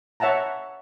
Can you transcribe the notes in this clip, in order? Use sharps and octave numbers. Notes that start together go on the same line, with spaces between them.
C#5 E5 F#5 A5 A#5